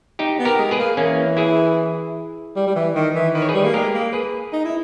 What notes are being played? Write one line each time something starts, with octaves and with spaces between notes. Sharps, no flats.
D#4 G4
B3
G4 A#4
G#3
G#4 B4
A#3
E3 A#3 C#4
E4 G#4
G3
G3
E3
D#3
E3
D#3 B4
C#5
G#4 B4
G3
A#3
G#3 G4 A#4
A#3
G#4 B4
D#4
E4